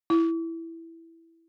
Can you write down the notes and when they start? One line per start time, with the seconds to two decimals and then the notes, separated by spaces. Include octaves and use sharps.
0.10 E4